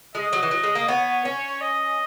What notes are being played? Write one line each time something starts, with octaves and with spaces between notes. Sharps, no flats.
G#3 D#5
F#3
E3
F#3
G#3
A#3
B3 C#5
C#4
D#5